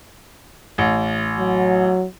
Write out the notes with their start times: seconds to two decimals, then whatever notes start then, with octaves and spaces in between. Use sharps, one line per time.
0.78 A1
1.39 F#3